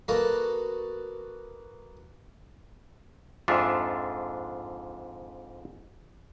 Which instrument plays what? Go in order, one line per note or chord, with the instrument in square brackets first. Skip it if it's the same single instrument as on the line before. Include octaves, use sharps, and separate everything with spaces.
[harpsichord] A#3 F#4 A4 B4 D#5 A5
[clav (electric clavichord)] F2 G#2 D4 F4 E5